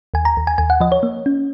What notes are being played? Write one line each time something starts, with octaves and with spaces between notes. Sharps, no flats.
D#2 G#5
A#5
D#2
G#5
D#2 G#5
F#5
F3 D#5
C#5
A#3
C#4